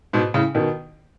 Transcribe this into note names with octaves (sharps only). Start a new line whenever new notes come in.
G#2 B2
A2 C#3
B2 D#3